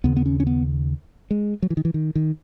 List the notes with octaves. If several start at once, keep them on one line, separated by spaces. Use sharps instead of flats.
D#2 C#3 B3
B3
C#4
C#4
B3
G#3
F#3
E3
D#3
E3
D#3
D#3